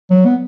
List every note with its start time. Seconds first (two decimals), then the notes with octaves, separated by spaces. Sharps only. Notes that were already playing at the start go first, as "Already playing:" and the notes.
0.10 F#3
0.25 B3